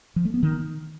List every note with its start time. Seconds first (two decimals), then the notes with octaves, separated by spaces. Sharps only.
0.16 F3
0.25 A3
0.34 B3
0.43 D#3